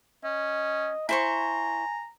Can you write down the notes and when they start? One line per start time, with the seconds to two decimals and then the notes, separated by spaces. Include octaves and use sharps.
0.24 C#4 D#5
1.09 E4 C5 G#5 A#5 C#6